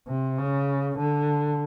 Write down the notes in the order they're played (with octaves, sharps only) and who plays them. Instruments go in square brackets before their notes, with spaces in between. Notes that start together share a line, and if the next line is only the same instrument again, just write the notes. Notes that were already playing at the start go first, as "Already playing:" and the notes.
[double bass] C3
C#3
D3